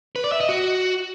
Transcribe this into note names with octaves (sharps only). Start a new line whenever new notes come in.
B4
D5
E5
D#5
F#4